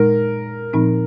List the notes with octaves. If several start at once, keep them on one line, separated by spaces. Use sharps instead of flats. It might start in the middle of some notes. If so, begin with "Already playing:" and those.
Already playing: A#2 G#3 D#4 A#4
A#2 F3 C4 D#4